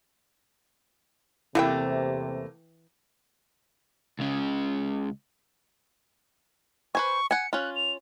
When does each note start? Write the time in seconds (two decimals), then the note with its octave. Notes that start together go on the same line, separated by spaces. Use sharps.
1.55 E2 C3 E3 A3 A#3 E4 F#5 G5
4.19 C#2 C#3
6.95 B4 C5 G#5 C#6
7.31 F#5 G#5 C#7
7.53 C#4 F4 F#6
7.75 F7